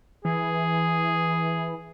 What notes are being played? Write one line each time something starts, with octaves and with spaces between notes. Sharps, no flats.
E3 G#4